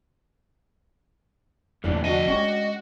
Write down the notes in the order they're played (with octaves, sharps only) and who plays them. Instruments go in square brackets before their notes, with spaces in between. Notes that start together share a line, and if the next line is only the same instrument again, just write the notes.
[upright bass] E2 D3 [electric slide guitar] A#2 E3 G3 [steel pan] A3 D4
[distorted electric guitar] F3 G#5 [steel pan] D4 F#4 [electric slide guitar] D#5
[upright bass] G#3 [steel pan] C#4 G4 [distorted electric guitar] F#4